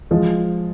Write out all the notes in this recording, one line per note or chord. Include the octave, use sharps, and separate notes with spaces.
F3 G#3